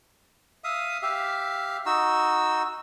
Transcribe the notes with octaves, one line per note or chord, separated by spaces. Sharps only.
E5 F5 D#6
G4 E5 F5
D#4 F#4 E6